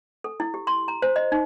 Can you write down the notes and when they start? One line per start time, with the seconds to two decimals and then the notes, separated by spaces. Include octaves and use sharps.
0.24 A4
0.40 E4
0.54 G4
0.67 C6
0.88 A#5
1.02 C5
1.16 D#5
1.32 D#4